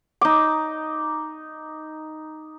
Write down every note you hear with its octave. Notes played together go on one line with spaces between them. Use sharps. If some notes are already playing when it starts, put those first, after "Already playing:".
D#4 D6